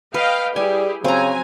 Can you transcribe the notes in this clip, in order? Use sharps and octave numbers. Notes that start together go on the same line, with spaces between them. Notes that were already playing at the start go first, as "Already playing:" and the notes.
B4 D#5 F5 G5
G3 E4 G4 G#4 G#5
C#3 F#3 C4 G#5 A#5